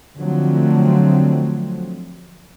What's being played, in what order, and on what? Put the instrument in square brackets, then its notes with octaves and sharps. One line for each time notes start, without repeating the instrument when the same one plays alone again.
[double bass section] D3 F3 F#3 A3 C4